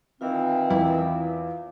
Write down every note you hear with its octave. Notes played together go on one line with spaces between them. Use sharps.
D#3 E3 C4 F4 F5
E2 E4